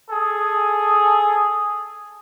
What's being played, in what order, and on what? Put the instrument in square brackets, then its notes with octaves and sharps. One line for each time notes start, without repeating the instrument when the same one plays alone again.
[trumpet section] G#4 A4 D#6